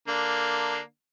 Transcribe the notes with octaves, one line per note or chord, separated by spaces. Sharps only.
D3 A#3 D4